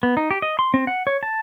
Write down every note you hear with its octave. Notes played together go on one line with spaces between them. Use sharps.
B3
D#4
G4
D#5
C6
C4
F#5
C#5
A5